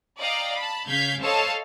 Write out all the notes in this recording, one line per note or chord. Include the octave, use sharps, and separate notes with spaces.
D5 D#5 F5 G5 A#5
A5 B5
C#3 F5 G6 G#6 B6
A4 C5 C#5 D#5 F5 A5